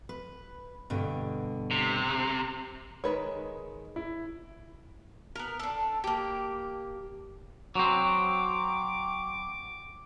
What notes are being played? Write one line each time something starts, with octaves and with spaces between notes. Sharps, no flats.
B4
G2 B2 D3
C3
D#3 G#3 B4 C#5
E4
B3 A#4
D4 A4
A#3 G4
F#3 C4 D6